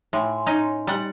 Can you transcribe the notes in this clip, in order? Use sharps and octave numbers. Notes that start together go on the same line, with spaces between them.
A2 G#5 C6
C#4 D#4
G3 F#5